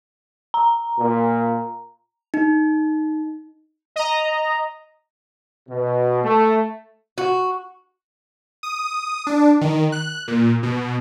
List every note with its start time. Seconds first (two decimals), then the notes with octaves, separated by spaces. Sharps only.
0.54 A#5
0.98 A#2
2.34 D#4
3.96 D#5 A#5
5.69 B2
6.24 A3
7.18 F#4
8.63 D#6
9.27 D4
9.61 D#3
9.92 F#6
10.28 A#2
10.63 B2